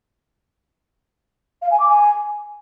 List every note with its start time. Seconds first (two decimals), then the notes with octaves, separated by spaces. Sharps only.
1.62 F5
1.71 G#5
1.80 D6
1.89 G#5